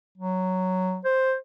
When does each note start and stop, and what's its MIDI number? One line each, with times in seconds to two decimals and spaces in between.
0.18 0.99 54
1.04 1.35 72